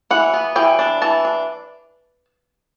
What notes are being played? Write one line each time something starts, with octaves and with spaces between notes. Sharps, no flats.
E3 F#5
B3
E3 G5
D4
E3 A5
D4